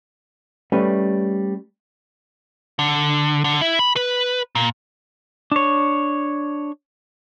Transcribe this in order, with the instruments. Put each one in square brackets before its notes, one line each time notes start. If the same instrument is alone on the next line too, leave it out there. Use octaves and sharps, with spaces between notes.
[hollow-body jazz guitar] G3 A3 C#4 B4
[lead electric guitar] D3
D3
E4
B5
B4
A#2
[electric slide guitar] D4 C#5